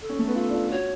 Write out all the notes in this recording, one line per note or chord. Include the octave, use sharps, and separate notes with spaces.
A4
C#4
A3
B3
F4 A4
D4
F4
F#4 C#5